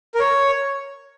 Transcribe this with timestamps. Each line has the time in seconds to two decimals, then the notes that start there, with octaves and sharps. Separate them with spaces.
0.15 A#4
0.19 C#5